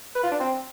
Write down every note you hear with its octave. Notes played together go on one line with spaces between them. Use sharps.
B4
F4
D4
C4